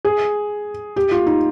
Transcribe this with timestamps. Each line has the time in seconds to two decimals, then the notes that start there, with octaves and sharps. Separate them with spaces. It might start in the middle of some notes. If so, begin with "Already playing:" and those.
0.05 G#4
0.96 G4
1.11 F4
1.26 D#4